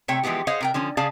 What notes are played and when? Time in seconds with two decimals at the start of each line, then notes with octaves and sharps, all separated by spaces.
0.08 C3 A3 C#5 G5
0.23 E3 F3 G#3 B3 G4
0.47 G#4 C5 C#5 D#5 F5 F#5
0.61 C3 A#4 G5
0.74 D3 F3 C#4
0.97 C#3 G#4 D5 F5 A5